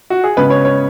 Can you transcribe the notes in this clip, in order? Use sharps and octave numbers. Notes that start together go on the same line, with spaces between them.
F#4
G#4
C#3 G#3 B3 B4
C#5
C#5